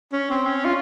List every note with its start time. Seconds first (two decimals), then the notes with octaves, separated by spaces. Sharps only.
0.13 C#4
0.30 C4
0.46 C#4
0.65 F4